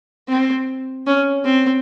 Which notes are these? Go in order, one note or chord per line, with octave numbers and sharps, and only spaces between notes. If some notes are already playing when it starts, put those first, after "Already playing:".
C4
C#4
C4